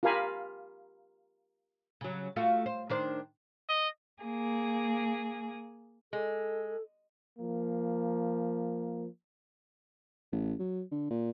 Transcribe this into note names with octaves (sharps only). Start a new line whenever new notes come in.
F4 G4 A#4 F5 G#5 B5
C#3 F#3
A3 F4 F#4
C5
D#3 D4 C5
D#5
A#3 G#4
G#3 A4
F3 A#3
A1
F#3
D3
A#2